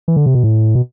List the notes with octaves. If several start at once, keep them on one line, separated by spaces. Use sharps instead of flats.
E3
D3
C3
B2
A2
B2